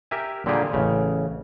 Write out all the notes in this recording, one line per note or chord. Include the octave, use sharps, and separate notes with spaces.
G4 A#4 E5 G#5
A#2 D3 G3 A#3 G4 G#4
A1 C#3